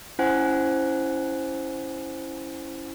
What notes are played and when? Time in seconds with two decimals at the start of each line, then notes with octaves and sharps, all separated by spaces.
0.19 C#4 E4 C5 F#5 G#5 F#6